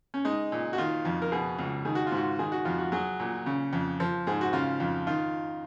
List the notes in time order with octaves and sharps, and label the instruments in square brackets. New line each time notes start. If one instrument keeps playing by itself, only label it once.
[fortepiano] C#4
G#3 D#4
A#2
F#4
D#3 F4
F2
A#4
B2 G#4
C#2
D#3 G#4
F#4
F4
G#2 F#4
D#3 G#4
F#4
F2 F4
F#4
F#3 G#4
A#2
C#3
F2
F3
G#2 G#4
F#4
C#3 F4
F2
D#3 F4